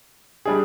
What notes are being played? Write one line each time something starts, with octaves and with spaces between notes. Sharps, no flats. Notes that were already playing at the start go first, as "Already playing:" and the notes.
G3 D4 G#4